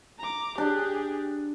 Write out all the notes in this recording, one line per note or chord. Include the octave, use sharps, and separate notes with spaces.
A#5 D6
D4 G4 G#4